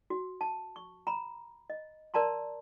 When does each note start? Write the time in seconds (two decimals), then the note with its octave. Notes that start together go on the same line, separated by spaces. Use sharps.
0.10 F#4
0.41 A5
0.76 C#6
1.07 A#5 B5
1.70 D#5
2.14 A#4 D5 A5 A#5 C6